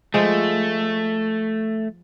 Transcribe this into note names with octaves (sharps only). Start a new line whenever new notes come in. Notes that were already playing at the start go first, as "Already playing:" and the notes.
F3 G#3 A3